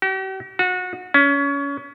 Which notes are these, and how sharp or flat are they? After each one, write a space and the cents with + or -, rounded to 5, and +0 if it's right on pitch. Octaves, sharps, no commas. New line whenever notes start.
G4 -45
F#4 -25
C#4 +25